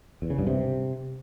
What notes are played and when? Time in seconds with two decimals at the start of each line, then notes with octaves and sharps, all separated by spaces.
0.22 E2
0.30 C#3
0.39 G2
0.47 C3